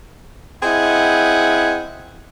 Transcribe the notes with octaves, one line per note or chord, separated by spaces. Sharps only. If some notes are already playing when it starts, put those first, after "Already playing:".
C4 E4 G#4 D#5 F#5